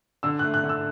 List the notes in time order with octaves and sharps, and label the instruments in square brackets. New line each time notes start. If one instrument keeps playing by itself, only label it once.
[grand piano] D3 [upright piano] E6
[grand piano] A3 [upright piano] F#6
[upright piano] F#6
[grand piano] D3
[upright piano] E6